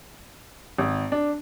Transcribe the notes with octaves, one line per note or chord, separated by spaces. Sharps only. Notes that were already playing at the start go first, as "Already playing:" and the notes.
G#1
D4